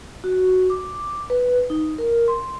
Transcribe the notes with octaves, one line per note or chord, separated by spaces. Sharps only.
F#4
D6
B4
D#4
A#4
C6